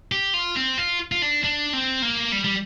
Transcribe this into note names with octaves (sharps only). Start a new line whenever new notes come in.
G4
F4
C4
F4
F4
D4
D4
C4
A#3
G3
G3